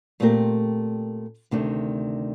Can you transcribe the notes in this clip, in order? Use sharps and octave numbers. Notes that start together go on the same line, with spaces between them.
A#2 A3 C4 G4 A#4
D2 C3 D#3 A3 D4